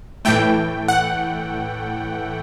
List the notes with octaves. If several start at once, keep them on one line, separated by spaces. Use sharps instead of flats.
A2 E3 A3 G5
F#5